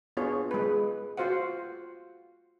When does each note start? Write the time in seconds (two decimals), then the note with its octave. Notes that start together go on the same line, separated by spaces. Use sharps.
0.17 B3 D4 F4 G#4 C#5
0.51 G#3 B4
1.17 F4 F#4 C5 F5 F#5